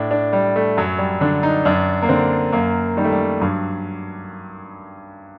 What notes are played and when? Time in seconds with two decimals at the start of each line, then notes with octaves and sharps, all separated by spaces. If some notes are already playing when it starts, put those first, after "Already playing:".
Already playing: A2 D4
0.11 D4
0.33 G3
0.56 A3
0.77 F#2 F#3
0.99 G3
1.21 D3 D4
1.43 D#4
1.65 F#2 D4
2.02 A#3
2.09 D3 C4
2.52 F#2 A#3
2.97 D#3 G3
3.04 A3
3.12 G3
3.41 G2 F#3